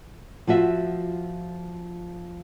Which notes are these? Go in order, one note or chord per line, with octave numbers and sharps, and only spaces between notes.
F3 F4 F#4 E5